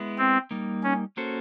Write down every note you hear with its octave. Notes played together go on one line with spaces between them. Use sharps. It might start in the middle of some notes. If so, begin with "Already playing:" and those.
Already playing: G#3 B3 E4
C4
G3 A#3 D#4
C#4
A#3 C#4 F#4 A4 C5